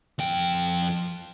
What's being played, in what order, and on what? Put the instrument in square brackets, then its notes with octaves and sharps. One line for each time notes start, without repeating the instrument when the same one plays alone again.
[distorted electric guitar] F2 G5